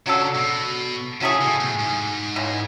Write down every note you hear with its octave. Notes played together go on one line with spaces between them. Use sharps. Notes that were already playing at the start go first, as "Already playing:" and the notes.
C#3 F#3 A3 D4 A4
B2
C#3 F#3 A3 E4 G#4
B2
A2
G#2
C#3 E3 G#3